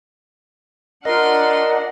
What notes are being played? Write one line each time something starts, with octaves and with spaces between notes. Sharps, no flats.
D4 F4 A#4 D#5 F#5 C6